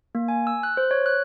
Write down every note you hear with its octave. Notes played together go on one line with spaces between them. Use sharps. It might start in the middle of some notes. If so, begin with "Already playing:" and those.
A#3
G#5
E6
F#6
C5
C#5
F#6